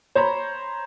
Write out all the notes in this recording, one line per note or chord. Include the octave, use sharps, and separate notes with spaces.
C5 C#5 A#5 B5